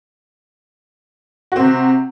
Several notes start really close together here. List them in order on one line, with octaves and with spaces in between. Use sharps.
F#4 C4 C3